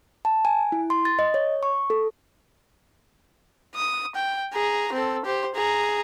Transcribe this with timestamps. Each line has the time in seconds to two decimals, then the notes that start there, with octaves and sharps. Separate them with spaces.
0.25 A5
0.45 G#5
0.72 E4
0.90 C6
1.05 A6
1.19 D#5
1.34 C#5
1.63 C#6
1.90 A4
3.76 D#6
4.15 G5
4.53 G#4 A#5
4.93 C4 A4
5.25 G4 C5
5.55 G#4 A#5